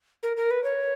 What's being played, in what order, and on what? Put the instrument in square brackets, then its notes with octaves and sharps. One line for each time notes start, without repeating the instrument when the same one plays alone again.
[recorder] A#4
A#4
B4
C#5